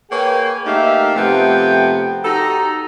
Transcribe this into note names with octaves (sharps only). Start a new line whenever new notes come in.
A#3 G#4 B4 C#5 G5 G#5
A3 A#3 D#4 G4 E5 F5
C3 F3 A3 B3 G5
D#4 F#4 G4 A4 A#5